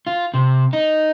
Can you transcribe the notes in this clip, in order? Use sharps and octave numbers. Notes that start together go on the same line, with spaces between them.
F4
C3
D#4